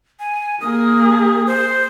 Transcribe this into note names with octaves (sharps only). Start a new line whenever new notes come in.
G#5
A#3 G#4 D#6
C5